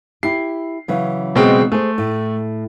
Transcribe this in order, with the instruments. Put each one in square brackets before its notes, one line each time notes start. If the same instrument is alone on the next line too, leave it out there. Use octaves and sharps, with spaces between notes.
[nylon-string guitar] E4 G4 [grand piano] C7
[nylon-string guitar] C#3 E3 F#3
[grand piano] B2 G#3 C4
[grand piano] A3 [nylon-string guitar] G#4 C5
[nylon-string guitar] A2